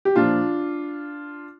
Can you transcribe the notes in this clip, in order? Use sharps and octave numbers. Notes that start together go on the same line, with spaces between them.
G4
A#2 F3 D4 F4